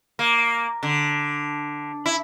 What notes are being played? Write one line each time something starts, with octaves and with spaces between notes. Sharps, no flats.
A#3
D3
E4